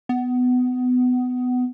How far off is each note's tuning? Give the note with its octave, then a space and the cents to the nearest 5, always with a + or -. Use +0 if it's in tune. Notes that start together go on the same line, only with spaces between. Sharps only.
B3 +20